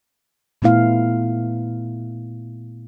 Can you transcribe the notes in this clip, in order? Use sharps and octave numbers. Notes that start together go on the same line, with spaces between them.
A#2 A3 B3 E4 F5